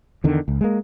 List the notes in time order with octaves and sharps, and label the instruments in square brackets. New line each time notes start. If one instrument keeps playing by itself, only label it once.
[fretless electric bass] E2 D3 D#3
C#2
G#3 A#3